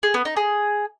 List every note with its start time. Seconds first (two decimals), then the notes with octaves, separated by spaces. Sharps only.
0.03 G#4
0.14 B3
0.25 D#4
0.36 G#4